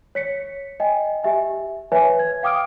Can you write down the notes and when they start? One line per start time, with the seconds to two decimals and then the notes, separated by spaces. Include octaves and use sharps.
0.15 C#5 B6 C#7
0.80 D#5 G5 G#5
1.23 G4 E5 G#5
1.92 B4 C#5 E5 G#5
2.19 G#6
2.43 F5 G5 D6 D#6 F6 D7